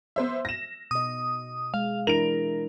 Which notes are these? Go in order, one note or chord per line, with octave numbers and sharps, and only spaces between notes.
B3 C5 E5
A#6 E7
B2 D#5 D#6
G#3 F5
E3 D4 E4 A#4 D7 F7